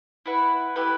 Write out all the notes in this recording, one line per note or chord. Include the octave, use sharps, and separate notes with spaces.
E4 B4 F#5
A3 E4 G4 B4